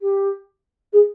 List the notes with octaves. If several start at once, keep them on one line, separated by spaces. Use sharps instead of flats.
G4
G#4